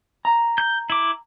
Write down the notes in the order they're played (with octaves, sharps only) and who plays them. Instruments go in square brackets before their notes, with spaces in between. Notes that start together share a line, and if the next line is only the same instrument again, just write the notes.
[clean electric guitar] A#5
[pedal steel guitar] G6
E4 D6